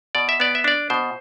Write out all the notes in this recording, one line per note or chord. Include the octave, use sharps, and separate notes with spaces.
B2 D5
E5
B3 D5
E5
D4 D5
B2 C5